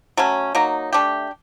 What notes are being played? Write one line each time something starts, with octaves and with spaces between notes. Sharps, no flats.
F#3 A3 C#4
F#3 A#3 D#4
A3 D4 G4